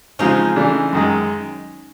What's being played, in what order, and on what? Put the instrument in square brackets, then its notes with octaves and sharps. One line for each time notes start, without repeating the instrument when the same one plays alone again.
[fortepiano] C#3 F3 G#3 C4 [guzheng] C#4 D#4
[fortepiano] C#3 E3 A3 D4
F#2 D#3 G#3